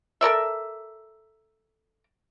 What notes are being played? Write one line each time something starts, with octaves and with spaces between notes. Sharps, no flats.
A4 A#4 D5 E5